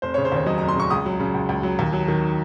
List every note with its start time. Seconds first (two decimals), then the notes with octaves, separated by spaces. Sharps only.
0.02 F1 C5
0.14 C#3 C#5
0.25 C5
0.32 D#2 C#5
0.46 F#3 D#5
0.58 F1 A#5
0.68 C6
0.75 C#3 C#6
0.90 C#2 D#6
1.06 F#3
1.20 C#3
1.34 C#2
1.49 C#2
1.63 F#3
1.79 D#2
1.93 F#3
2.08 D#3